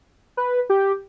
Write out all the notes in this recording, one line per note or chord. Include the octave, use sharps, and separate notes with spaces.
B4
G4